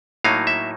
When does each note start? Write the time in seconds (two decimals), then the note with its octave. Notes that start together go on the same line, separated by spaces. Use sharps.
0.24 A2 F#3 A#3 D#4 F5
0.47 E5